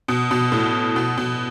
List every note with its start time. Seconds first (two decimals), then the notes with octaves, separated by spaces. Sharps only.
0.08 B2
0.31 B2
0.52 A2
0.96 B2
1.17 B2